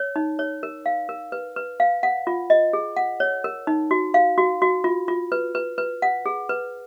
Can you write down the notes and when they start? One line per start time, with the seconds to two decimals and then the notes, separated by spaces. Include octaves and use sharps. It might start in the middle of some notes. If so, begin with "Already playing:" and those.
Already playing: C#5
0.16 D#4
0.39 C#5
0.63 A#4
0.86 F5
1.09 A#4
1.32 B4
1.56 B4
1.80 F5
2.03 F#5
2.27 F4
2.50 D#5
2.73 G#4
2.96 F#5
3.20 C#5
3.44 A#4
3.67 D#4
3.91 F#4
4.14 F5
4.38 F#4
4.62 F#4
4.84 F4
5.08 F4
5.32 B4
5.55 B4
5.78 B4
6.02 F#5
6.26 G#4
6.49 B4